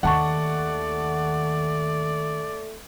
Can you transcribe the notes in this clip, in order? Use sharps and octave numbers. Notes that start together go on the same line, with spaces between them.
D#2 D#3 A3 D5 F#5 A5 C#6